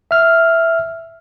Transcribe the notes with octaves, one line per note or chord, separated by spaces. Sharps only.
E5 F6